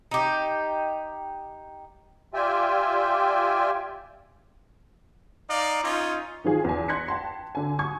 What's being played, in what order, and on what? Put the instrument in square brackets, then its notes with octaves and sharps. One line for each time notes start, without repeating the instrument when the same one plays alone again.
[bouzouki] D#4 G4
[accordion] F4 G4 D5 E5 G5 G#5
[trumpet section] D#4 D5 F5
C#4 D#4 F4
[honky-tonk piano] D#3 F3 G#4
E2 G#5
C6 F#6 G#6 A#6 B6 C#7
G5 A5 C6
D3 G#5
G#5 C#6 D#6 G#6